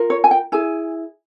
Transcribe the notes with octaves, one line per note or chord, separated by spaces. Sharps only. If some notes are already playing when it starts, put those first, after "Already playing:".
Already playing: F4 A#4
C#5
G#5
G5
E4 G#4 G#5